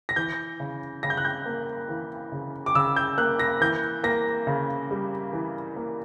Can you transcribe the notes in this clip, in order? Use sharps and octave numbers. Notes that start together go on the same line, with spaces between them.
A#6
E3 G6
C#3
C#3 A#6
G6
F#6
G6
A#3
E3
C#3
D6
C#3 E6
G6
A#3 F#6
A#6
E3 G6
A#3 A#6
C#3
G3
E3
A#3